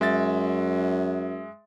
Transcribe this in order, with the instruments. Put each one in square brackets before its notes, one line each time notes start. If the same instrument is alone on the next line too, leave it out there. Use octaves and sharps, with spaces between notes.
[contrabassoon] F#2 [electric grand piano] G#3 E5 A6